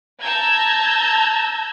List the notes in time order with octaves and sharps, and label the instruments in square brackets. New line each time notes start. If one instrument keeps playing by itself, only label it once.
[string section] A5 A#5 E6 G6 G#6